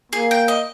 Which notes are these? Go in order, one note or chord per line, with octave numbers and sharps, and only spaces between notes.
A#3 G#4
G5
D#5